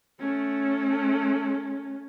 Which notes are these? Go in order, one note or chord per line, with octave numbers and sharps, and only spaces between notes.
A3 C#4